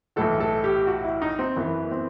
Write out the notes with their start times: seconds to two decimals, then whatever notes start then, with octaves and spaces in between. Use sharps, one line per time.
0.16 B1 A2 E3 A4
0.40 A4
0.64 G4
0.87 F#4
1.04 E4
1.22 D#4
1.39 C4
1.56 F#1 F#2 E3 B3
1.91 C4